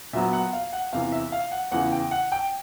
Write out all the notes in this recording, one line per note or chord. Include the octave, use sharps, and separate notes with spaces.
A#2 F#3 B3 E5
F#5
F5
F#5
E2 C3 E3 F5
E5
F5
F#5
E2 C#3 E3 F#5
G5
F#5
G5